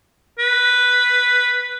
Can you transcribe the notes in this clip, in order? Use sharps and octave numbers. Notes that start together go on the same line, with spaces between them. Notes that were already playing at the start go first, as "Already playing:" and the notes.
B4